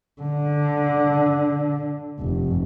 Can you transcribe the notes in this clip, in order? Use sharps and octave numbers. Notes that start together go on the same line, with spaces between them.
D3
F1